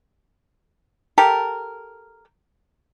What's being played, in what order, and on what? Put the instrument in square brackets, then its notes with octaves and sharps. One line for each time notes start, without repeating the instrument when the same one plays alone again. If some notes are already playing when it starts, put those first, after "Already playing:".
[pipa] G4 A4 A#4